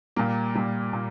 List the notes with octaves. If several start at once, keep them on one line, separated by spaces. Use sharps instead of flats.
A#2 G3 A#3
A#2 G3
A#2